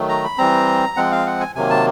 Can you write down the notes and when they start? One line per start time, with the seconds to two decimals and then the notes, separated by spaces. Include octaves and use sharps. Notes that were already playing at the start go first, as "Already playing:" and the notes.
Already playing: D#3 F#3 A3
0.09 A#5
0.24 B5
0.38 E3 G3 C4 A#5
0.97 F3 G#3 C4 F#5
1.12 F5
1.27 F#5
1.40 G#5
1.55 C3 D#3 F#3 A#3 G#5
1.70 A5